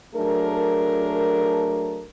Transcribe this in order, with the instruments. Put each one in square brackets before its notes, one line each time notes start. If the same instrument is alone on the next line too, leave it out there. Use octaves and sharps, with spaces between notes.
[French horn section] F#3 A3 D4 G#4 A#4